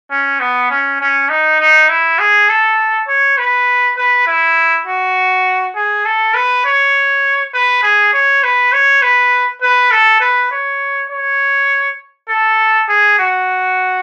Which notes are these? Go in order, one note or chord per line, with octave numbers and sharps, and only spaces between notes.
C#4
B3
C#4
C#4
D#4
D#4
E4
G#4
A4
C#5
B4
B4
E4
F#4
G#4
A4
B4
C#5
B4
G#4
C#5
B4
C#5
B4
B4
A4
B4
C#5
C#5
A4
G#4
F#4